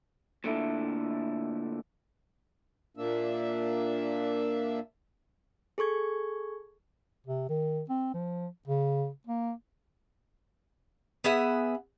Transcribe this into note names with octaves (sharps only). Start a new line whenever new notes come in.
A#2 D3 A3 E4 A4
A#2 A#3 D4 E5
G#4 A4 C#6 G#6
C3
D#3
C4
F3
C#3
A#3
B3 G#4 E5 F#5